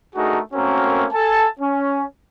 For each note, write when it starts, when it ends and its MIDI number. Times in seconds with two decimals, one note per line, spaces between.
0.15 0.39 57
0.15 0.39 62
0.15 0.39 63
0.15 0.39 66
0.15 0.39 68
0.15 0.39 70
0.54 1.06 57
0.54 1.06 58
0.54 1.06 60
0.54 1.06 61
0.54 1.06 66
0.54 1.06 70
1.12 1.45 69
1.12 1.45 80
1.12 1.45 81
1.60 2.03 61